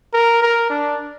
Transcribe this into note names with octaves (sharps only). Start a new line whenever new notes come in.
A#4
A#4
D4